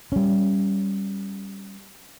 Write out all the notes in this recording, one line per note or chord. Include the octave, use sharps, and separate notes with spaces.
G3 C#4